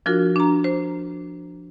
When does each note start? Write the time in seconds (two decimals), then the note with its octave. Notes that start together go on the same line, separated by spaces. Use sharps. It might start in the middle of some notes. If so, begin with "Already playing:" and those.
0.06 F3 D4 F4 F#4 A#4
0.36 D4 A#5
0.64 C5